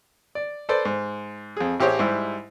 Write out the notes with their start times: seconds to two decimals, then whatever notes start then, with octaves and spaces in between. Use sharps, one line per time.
0.35 D5
0.69 A4 B4 C5 D5
0.85 G#2
1.57 F2 G#4
1.80 A1 G4 G#4 C5 C#5
1.99 G#2 G3 E4